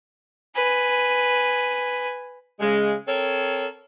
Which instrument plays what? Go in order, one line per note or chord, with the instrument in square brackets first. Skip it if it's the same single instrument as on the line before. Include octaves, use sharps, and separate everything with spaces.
[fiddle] B4 G#5
[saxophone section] C#3 G#3
C4 A4 A#4 C#5